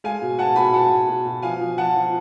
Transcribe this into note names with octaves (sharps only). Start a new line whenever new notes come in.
G#3 F5 G#5
B2
B2 F#5 A5
B2 G#5 B5
B2 F#5 A5
B2
B2
B2
F3 F5 G#5
F3
F3 F#5 A5
F3